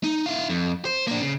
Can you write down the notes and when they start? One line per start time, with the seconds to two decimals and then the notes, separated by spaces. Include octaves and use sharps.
0.04 D#4
0.26 E4 F5
0.49 F2
0.85 C5
1.08 A#3 D4
1.21 C#3